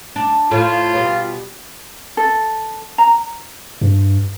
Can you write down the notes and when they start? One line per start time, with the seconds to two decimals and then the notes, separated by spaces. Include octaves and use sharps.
0.16 D4
0.51 A2 F3 F4
0.95 B2 G3
2.17 A4
2.98 A#5
3.81 G2